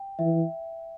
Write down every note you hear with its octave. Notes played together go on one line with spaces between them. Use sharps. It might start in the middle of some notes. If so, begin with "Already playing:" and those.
Already playing: G5
E3 E5